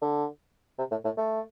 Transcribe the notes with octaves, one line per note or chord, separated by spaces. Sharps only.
D3
C3
A2
A2
A3